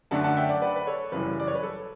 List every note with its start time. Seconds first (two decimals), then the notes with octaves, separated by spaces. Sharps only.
0.11 F#2 D3 A3 D4 F#5 A5
0.24 F#5 A5
0.37 E5 G5
0.49 D5 F#5
0.61 B4 D5
0.76 B4
0.87 A4 C#5
1.12 F#1 F#2 C#3 E3 G3 B4
1.40 D5
1.47 C#5
1.55 B4
1.63 A4